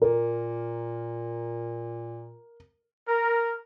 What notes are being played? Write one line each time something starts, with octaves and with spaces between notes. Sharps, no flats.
A#2 A#4
A#4